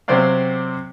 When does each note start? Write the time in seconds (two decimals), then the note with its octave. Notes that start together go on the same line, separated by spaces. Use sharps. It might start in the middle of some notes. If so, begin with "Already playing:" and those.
0.08 C3 F#3 C4 C5 D5 F5